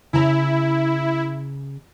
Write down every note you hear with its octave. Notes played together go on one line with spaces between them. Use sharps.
C#3 E4 A#5